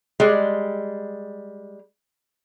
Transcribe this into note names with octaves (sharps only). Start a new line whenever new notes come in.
G3 G#3